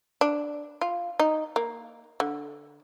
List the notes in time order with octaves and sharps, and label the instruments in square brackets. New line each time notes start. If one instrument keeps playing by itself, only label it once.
[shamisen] D4
F4
D#4
A#3
D3